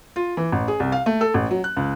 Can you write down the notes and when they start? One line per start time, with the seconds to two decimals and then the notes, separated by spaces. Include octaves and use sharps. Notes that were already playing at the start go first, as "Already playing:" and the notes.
0.16 F4
0.37 E3
0.52 A1
0.68 G#4
0.80 C2
0.92 F5
1.06 A3
1.21 A4
1.34 A1
1.51 F#3
1.64 F#6
1.77 C#2